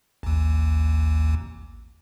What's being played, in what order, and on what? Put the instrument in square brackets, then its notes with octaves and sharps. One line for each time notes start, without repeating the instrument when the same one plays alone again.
[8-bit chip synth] A1 D#2